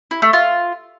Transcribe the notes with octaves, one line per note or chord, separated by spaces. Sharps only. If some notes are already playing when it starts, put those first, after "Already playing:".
E4
A3
F4